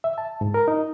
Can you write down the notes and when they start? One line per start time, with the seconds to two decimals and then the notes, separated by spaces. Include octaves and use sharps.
0.04 E5
0.18 A5
0.41 G#2
0.54 A#4
0.68 D#4